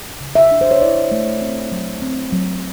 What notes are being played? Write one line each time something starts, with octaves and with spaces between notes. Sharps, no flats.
C#3
E5
D4
C5
C#5
E4 D5
A3
C4
F#3
C4
F#3